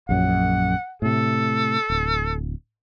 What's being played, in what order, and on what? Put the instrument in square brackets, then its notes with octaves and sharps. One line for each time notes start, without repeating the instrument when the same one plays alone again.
[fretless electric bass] A#1 F#2 [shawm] F#5
[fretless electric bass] A2 C3 [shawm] A4
[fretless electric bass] D1